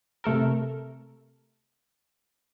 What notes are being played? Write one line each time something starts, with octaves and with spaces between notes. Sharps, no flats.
C3 A3 A4 A#4